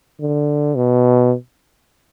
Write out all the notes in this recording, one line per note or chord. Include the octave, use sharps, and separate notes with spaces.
D3
B2